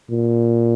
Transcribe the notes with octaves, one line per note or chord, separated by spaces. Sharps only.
A#2